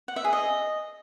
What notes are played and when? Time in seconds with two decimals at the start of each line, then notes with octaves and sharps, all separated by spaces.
0.08 F#5
0.16 E5
0.25 G#4
0.33 D#5